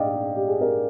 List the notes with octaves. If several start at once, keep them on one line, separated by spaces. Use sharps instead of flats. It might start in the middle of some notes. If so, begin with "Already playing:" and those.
Already playing: A#1 G#2 D5 D#5 F5 G5
G4
G#4
A#4